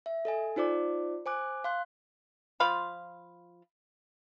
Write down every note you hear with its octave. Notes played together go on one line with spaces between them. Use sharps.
E5
A4 D#5 G#5
D#4 F4 C5 D5 D6
C5 G#5 D6 F#6
F5 C6 F#6
F3 F4 F5 B5